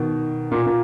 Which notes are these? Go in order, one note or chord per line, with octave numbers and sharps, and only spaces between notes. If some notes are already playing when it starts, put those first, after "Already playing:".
Already playing: B2 D#3
A#2
A#2